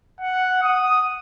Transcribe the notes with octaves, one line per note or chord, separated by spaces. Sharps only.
F#5
D#6